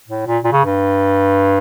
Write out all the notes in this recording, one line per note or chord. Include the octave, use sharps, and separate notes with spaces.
A2
A#2
A#2
C#3
G2